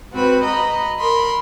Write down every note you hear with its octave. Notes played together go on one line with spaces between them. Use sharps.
G#2 C4 F#4 B4
D#5 A#5 B5
A#4 B5 C6